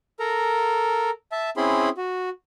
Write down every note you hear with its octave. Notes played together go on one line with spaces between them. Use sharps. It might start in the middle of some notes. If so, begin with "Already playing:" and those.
A4 A#4 A#5
E5 A5
C4 C#4 E4 G#4 B5 C6
F#4